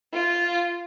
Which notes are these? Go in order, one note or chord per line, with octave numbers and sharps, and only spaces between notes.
F4